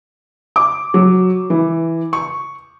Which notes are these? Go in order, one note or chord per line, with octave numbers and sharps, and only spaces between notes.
D6
F#3
E3
C#6